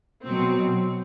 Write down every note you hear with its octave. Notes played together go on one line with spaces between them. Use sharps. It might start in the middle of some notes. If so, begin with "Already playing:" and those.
B2 F#3 C4